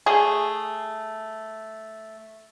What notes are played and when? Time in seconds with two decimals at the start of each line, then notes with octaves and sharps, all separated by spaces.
0.06 A3 G#4